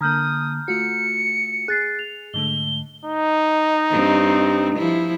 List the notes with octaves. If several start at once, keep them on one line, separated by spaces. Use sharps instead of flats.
D3 A#3 A#5 D#6 F6 G6
A3 F4 F#4 C#7
G#4 F#6 A6 C7
F7
G#2 D3 A3 G7
D#4
G2 C4
F3 E4